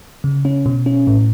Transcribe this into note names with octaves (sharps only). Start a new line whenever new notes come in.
C#3
C#4
B2
C#4
A2